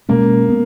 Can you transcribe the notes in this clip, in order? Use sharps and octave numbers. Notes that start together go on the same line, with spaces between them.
B2 G#3 A#3 C#4
B3